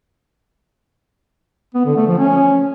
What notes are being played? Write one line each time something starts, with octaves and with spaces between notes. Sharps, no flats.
B3
D3
A3
F3
C#4